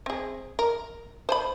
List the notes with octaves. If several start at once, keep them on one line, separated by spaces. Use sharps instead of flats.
C4 G#4
A#4
C5 G#5 B5